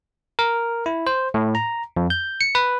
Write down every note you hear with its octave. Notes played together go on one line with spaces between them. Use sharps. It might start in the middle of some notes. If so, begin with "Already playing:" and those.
A#4
E4
C5
A2
A#5
F2
G6
C#7
B4